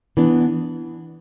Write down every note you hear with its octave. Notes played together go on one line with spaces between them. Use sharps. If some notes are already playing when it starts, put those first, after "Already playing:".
E3 B3 D4